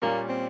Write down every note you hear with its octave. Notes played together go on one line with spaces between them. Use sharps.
A#2 G3 A#3 C#4
C4